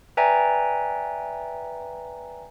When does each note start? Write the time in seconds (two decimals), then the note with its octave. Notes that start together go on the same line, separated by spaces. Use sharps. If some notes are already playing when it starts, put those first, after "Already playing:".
0.17 B4 D5 E5 G5 G#5 A#5